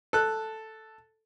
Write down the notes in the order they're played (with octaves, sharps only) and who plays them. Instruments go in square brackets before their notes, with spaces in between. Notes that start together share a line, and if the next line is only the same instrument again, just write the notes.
[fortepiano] A4 F#6